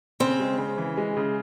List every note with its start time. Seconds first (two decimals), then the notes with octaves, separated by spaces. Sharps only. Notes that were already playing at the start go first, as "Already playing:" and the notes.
0.20 C#3 C4
0.40 G#3
0.58 C#3
0.78 E3
0.98 G#3
1.17 C#3